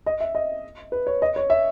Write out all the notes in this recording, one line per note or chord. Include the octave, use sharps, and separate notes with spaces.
D#5
E5
D#5
B4
C#5
D#5
C#5
E5